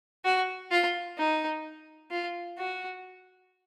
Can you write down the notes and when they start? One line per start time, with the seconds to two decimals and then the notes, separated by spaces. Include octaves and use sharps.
0.25 F#4
0.71 F4
1.18 D#4
2.11 F4
2.58 F#4